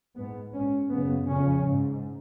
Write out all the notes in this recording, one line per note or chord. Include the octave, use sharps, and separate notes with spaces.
G#2 B3
G#2 C#4
F#2 C#3 B3
F2 C#3 C#4
G#2